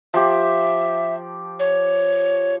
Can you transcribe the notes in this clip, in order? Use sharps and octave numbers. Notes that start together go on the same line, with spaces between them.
F3 G4 E5
C#5